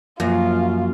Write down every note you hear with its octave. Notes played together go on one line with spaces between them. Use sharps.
F#2 F3 A#3 F4